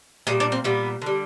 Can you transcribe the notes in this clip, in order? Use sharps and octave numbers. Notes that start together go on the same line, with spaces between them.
A#2 G3 G#4
D4
C4
A#2 G3 B3
D3 G3